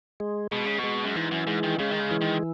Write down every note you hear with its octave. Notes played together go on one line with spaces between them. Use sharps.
G#3
B2 G#3
C#3
B2
G#3
F#2
G#2 E3
F#2
G#2 G#3
D#3
C#3 G#3
D#3
C#3
E3
D#3